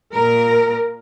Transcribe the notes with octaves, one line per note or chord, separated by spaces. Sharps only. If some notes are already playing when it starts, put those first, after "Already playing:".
A#2 A#4